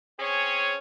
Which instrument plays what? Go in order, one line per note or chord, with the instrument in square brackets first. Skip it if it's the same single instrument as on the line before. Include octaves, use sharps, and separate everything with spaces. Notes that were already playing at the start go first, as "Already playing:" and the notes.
[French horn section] C4 C#4 G#4 C#5